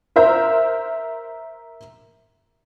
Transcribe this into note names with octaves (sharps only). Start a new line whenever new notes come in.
A#4 C5 E5 A#5 G6